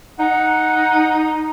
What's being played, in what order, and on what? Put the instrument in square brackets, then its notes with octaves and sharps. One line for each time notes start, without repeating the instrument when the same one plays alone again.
[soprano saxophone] D#4 [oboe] F#5